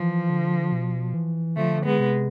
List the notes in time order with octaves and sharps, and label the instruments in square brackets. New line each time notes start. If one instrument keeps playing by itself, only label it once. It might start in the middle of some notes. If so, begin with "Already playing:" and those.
Already playing: [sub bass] E3 [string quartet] F3
[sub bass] D3
B2
E3
[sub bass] D3 [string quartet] F3 A3
[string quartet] G#3 B3
[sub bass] C3